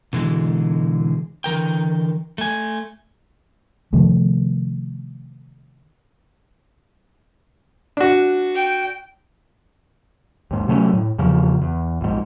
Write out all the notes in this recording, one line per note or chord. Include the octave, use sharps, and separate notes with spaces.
B2 D3 E3 G#3
D3 E3 A#4 G5
A3 G#5
C3 D#3 F3 A3
D4 F#4
G5
D#2 G#2
C3 F#3 A3 C#4
A2
E2 C#3 F3
E2
A#1 G#2